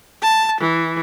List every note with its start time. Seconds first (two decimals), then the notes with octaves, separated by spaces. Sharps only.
0.22 A5
0.61 E3